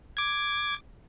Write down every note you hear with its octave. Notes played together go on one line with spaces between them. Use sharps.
D6 G#6